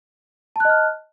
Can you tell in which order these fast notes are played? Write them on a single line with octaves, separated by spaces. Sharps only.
A5 F#6 D#5 F6